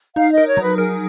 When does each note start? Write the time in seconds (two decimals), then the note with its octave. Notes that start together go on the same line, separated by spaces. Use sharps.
0.16 D#4 F5
0.32 D#5
0.37 A#4
0.47 C#5
0.57 F#3
0.62 B4
0.78 G#4 A#4